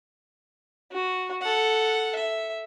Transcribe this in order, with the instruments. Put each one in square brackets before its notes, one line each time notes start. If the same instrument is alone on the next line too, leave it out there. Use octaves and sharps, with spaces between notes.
[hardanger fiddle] F#4
A4 F#5
E5